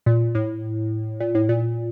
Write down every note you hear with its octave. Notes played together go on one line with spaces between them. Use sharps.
A#2
A2
A#2
A2
A#2